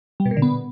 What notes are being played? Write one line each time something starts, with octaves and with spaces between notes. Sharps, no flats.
G3
B2
A#2
D3
B3